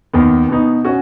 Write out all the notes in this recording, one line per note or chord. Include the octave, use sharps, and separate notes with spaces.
D#2 D#3 B3
B2 B3 D#4
C#4 F#4